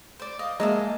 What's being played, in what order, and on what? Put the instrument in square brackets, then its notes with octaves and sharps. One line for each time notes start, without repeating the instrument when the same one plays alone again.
[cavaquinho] C5 D5
[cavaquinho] D#5 [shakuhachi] F5
[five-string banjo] G#3 [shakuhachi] A#3 [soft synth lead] D#5 [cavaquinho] E5 A5 A#5